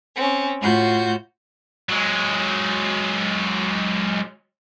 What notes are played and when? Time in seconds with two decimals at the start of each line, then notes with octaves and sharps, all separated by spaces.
0.17 C4 C#4
0.60 A2 F4 F#4 G6
1.89 F#3 G#3